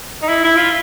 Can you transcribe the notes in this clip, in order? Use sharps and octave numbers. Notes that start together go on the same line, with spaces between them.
D#4
E4
E4
F4